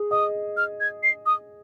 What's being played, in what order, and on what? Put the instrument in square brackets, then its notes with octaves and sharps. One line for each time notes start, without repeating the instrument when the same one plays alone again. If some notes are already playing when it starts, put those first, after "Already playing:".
Already playing: [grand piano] G#4
[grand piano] D#5 [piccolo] D#6
[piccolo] F6
G#6
C7
D#6